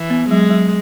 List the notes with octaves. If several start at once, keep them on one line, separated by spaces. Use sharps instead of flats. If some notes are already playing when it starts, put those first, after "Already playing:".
Already playing: E3
B3
F#3 G#3
F#3